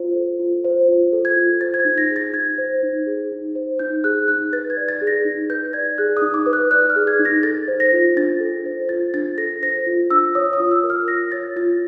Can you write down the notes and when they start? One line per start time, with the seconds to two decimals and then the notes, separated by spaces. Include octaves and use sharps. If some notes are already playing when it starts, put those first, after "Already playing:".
Already playing: F4 C5
0.15 A4
0.39 F4
0.64 C5
0.88 F4
1.13 A4
1.25 G#6
1.36 F4
1.61 C5 A6
1.74 G#6
1.79 A6
1.85 D#4
1.98 A#6
2.10 G#4
2.16 A6
2.33 D#4 G#6
2.58 C5
2.83 D#4
3.06 G#4
3.32 D#4
3.55 C5
3.79 D#4 G6
4.04 G#4 F#6
4.28 D#4 F#6
4.53 B4 A6
4.70 G#6
4.77 D5
4.89 A6
5.01 G#4
5.07 A#6
5.25 D#4
5.49 B4 G6
5.73 D5 G#6
5.98 G#4 F#6
6.17 D#6
6.22 D#4
6.34 D6
6.46 B4
6.53 F#6
6.71 D5 F#6
6.90 F6
6.96 G#4
7.07 G#6
7.19 D#4
7.25 A#6
7.43 A4 A6
7.68 C5
7.80 A#6
7.93 F4
8.16 D4 A6
8.40 A4
8.65 C5
8.89 F4 A6
9.14 D4 A6
9.38 A4 A#6
9.62 C5 A#6
9.87 F4
10.11 D4 E6
10.35 C#5 D#6
10.53 D#6
10.60 F4
10.71 E6
10.84 A#4
10.90 F6
11.08 F4 A#6
11.32 C#5 A6
11.56 F4 A6